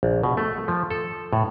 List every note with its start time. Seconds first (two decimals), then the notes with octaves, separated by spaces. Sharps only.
0.03 A#1
0.23 B2
0.37 A3
0.68 F3
0.90 A4
1.33 A2